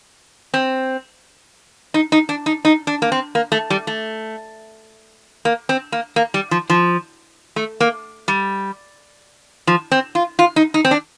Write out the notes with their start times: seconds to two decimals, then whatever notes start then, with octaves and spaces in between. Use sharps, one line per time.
0.54 C4
1.94 D#4
2.12 D#4
2.29 D4
2.46 D#4
2.65 D#4
2.87 D4
3.02 A#3
3.12 C4
3.35 A#3
3.52 A3
3.70 G3
3.87 A3
5.45 A#3
5.69 C4
5.92 A#3
6.16 A#3
6.34 G3
6.51 F3
6.70 F3
7.56 A3
7.80 A#3
8.28 G3
9.67 F3
9.92 C4
10.15 F4
10.39 F4
10.56 D#4
10.74 D#4
10.85 C4
10.91 D4